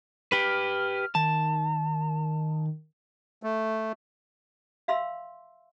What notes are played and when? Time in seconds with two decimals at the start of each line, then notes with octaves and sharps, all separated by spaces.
0.32 G4 B4 F6
1.15 D#3 A5
3.43 A3
4.88 E5 F5 B5 C6 E6